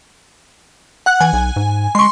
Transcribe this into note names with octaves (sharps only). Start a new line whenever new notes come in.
F#5 F#6
E3 G#5
B1
G#2
G#3 C6 C#6